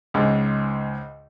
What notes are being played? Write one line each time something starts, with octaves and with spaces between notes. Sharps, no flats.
C#2 G#2